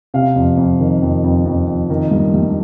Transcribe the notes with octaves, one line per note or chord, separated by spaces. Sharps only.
C3 F5
F2
F2
D#3
F2
F2
F2
F2
D#3
G2
G2